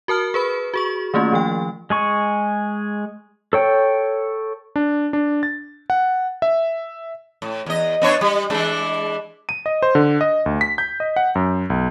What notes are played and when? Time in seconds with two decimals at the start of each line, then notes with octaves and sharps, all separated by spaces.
0.08 F#4 A#4 A5 F6
0.34 G#4 B4 B5
0.74 F#4 G#4 C#6
1.14 D#3 A3 A#3 C#4 F4
1.32 D#3 F3 G5
1.90 G#3 G#4 C#6
3.53 A4 C#5 G5
4.76 D4
5.13 D4
5.43 A6
5.90 F#5
6.42 E5
7.42 A2
7.66 E2 D#5
8.02 B3 D4 C#5
8.21 G3
8.50 E3 G#3 D4
9.49 D#7
9.66 D#5
9.83 C5
9.95 D3
10.21 D#5
10.46 D2
10.61 B6
10.78 G6
11.00 D#5
11.16 F#5
11.35 F#2
11.70 B1